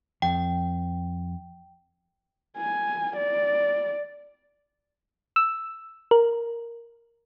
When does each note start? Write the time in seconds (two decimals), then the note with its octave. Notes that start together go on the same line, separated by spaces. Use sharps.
0.22 F2 G5
2.58 G#5
3.17 D5
5.36 E6
6.11 A#4